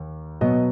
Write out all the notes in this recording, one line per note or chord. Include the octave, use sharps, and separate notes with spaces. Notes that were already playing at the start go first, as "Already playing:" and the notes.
Already playing: D#2
B2 F#3 B3 D#5